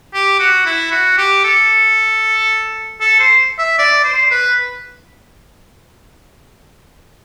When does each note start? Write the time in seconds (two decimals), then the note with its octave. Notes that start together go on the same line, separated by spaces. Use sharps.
0.14 G4
0.40 F#4
0.66 E4
0.91 F#4
1.18 G4
1.44 A4
3.01 A4
3.20 C5
3.59 E5
3.79 D5
4.04 C5
4.31 B4